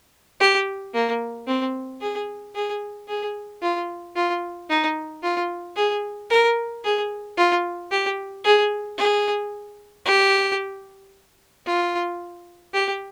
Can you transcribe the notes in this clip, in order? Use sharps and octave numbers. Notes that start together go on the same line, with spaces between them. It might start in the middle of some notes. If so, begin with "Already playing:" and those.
G4
A#3
C4
G#4
G#4
G#4
F4
F4
D#4
F4
G#4
A#4
G#4
F4
G4
G#4
G#4
G4
F4
G4